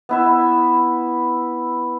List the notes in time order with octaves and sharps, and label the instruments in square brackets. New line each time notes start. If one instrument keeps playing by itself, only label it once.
[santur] B3 E4 E5